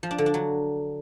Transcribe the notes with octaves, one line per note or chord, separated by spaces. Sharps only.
F3
D4
D3
D4
F#3